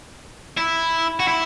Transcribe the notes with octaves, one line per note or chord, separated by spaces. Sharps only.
E4
F#4
E4